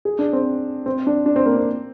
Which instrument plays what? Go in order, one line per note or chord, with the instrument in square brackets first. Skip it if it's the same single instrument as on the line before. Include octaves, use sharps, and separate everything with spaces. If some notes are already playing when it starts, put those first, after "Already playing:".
[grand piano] G#4
D4
C4
C4
D4
D4
C4
A#3
C4